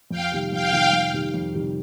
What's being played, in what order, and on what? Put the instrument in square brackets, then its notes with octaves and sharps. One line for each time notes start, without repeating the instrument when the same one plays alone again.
[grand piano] F2 [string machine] F5 G5
[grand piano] C3 D#3 G3
[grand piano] F2 [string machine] F5 G5
[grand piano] C3 D#3 G3
F2
C3 D#3 G3
F2
C3 D#3 G3